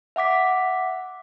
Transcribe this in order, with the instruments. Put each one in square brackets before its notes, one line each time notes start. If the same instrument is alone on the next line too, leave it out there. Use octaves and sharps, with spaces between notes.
[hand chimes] E5 F#5 D6 B6